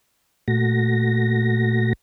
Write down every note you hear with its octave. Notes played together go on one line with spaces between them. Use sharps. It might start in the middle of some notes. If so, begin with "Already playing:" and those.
A#2 A3 F#4 A#6